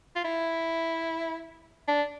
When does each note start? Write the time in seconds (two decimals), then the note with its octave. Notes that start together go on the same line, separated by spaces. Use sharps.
0.16 F4
0.25 E4
1.88 D4